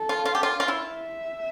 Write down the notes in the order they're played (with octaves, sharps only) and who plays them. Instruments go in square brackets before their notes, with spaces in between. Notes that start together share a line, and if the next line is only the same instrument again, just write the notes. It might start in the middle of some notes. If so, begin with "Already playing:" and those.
Already playing: [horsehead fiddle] A4
[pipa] F4
F4
G4
F4
F4
E4
[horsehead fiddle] E5